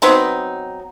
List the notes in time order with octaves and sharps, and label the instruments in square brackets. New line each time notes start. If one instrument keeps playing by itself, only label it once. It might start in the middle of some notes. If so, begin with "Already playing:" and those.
[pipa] F#3 B3 C4 D#4